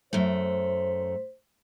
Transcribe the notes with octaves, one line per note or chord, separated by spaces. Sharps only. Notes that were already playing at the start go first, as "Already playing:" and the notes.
F#2 A3 C5